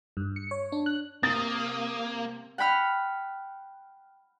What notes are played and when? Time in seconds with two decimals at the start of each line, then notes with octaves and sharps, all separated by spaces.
0.17 G2
0.36 C#7
0.51 C#5
0.72 D4
0.86 F#6
1.23 C3 A#3 D#6 A6
2.58 F#5 G5 B5 F6